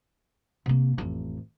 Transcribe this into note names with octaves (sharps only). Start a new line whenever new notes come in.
C3 A#3
A1 F2